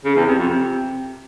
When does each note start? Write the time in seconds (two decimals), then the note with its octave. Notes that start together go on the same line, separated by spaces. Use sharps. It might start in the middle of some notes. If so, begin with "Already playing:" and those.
0.05 C#3
0.16 E2
0.27 C3
0.38 F2
0.49 C3